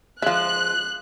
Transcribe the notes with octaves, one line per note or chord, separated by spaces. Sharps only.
F3 G#3 E5 F5 F#6